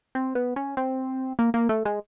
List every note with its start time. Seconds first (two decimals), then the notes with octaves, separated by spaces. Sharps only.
0.15 C4
0.35 B3
0.56 C#4
0.77 C4
1.39 A#3
1.54 A#3
1.69 A3
1.85 G#3